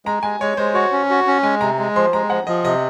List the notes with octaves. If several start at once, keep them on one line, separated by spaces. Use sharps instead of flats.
G#3 A#5
G#3 G#5
G#3 C#5
G#3 C5
F#4 C#5
C#4
F#4
C#4
G#3 G#5
C3 A#5
G#3
F3 C6
G#3 A#5
F3 F#5
F3 D#5
C3 D#5